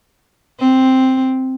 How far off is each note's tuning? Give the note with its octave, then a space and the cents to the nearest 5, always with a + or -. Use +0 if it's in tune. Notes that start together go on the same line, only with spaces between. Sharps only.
C4 +0